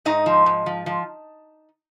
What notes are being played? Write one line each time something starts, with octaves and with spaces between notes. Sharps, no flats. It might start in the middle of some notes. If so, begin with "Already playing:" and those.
G#2 D#4 D#5
F3
G#2
F3
F3